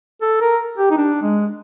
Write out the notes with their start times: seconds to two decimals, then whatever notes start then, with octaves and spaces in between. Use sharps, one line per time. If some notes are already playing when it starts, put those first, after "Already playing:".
0.22 A4
0.41 A#4
0.78 G4
0.90 D#4
0.97 D4
1.22 G#3